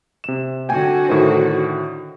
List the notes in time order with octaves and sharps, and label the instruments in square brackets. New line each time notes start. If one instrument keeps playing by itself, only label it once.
[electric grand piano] C3 E7
[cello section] D3 F#4 [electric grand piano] G5 G#5
[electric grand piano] A2 D#3 C5